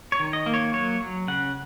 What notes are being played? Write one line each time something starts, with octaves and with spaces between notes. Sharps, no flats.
C#5
D#3
D#5
A#3
C#5
F#3 C#5
F#3
C#3 F#5